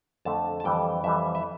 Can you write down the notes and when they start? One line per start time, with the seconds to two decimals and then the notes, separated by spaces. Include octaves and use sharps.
0.25 F2 D3 A3 A5
0.60 A5
0.64 F2 E3 G3 G5
1.04 F2 E3 G3 E5
1.35 E5